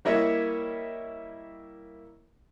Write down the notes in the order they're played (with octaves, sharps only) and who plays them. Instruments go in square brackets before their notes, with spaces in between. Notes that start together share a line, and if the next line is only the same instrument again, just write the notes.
[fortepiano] G3 A#3 E4 C#5 D#5 E5